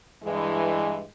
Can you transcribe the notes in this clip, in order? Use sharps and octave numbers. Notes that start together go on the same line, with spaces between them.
G2 E3 G#3